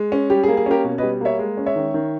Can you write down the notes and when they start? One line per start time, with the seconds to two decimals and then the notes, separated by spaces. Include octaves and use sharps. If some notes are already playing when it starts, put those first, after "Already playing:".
Already playing: G#3
0.12 C#4
0.30 G3 G4
0.43 G#4
0.48 A#3
0.57 G#4
0.66 C#4 G4 A#4
0.85 B2
0.98 G3 B4 D#5
1.21 A#3 C#5 E5
1.39 G#3
1.57 C#4
1.66 C#5 E5
1.76 D#3
1.94 D#3